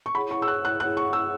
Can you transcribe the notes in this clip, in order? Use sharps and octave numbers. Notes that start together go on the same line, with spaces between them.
C#6
E4 G#4 C#5 F#5 B5
C#6
E6
F#6
F#6
E4 G#4 C#5 F#5 F#6
C#6
E6